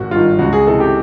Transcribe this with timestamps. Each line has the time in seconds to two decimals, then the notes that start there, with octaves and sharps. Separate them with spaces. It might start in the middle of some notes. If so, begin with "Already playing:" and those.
Already playing: G#1 F#4
0.11 G2 D#3 F4
0.38 C#2 F#4
0.53 G#4
0.67 C3 E3 A4
0.80 G4